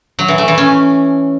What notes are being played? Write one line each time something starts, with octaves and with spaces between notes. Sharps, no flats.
F#3
E3
A3
E3
C#4